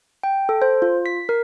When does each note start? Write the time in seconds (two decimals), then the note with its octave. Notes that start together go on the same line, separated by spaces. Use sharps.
0.23 G5
0.49 A4
0.62 C5
0.82 F4
1.06 B6
1.29 A#4